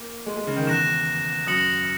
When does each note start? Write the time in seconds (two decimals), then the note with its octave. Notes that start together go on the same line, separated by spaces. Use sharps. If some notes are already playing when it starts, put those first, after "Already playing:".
Already playing: A#3
0.26 G#3
0.37 G#3
0.47 C#3
0.56 D#3
0.67 E2 F#6 A#6 E7
1.47 F#2 D#6 A#6 C#7 F#7